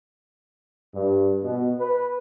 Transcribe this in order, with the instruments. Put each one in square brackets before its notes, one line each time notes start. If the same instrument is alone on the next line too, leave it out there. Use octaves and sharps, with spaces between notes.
[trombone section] G2
B2
B4